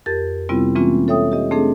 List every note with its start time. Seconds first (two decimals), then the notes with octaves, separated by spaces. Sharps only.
0.06 F2 G4 A#4 A6
0.49 C3 G3 B3 C4 E4 F4
0.75 E3 G#3 A#3 C4 C#4 F4
1.08 A4 C#5 E5 G5 D#6
1.32 G4 D#5
1.51 A3 C4 D4 G#4 A4